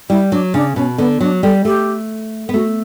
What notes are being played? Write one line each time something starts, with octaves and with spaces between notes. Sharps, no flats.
G3 E4
F#3 D4
C#3 D4
B2 C#4
D3 B3
F#3 D4
G3 A4
A3 G4
B3
A3 F#4